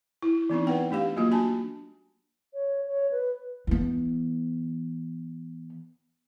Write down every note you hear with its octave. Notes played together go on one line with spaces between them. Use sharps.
E4
E3 B3 C4 D#4
B4 F#5 G5
A3 D4 G4 F5
F#3 A#3 F4 F#4
D4 G#5 A5
C#5
C#5
B4
E3 B3